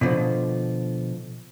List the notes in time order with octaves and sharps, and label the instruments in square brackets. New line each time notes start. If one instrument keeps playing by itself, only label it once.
[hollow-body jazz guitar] B2 D3 F3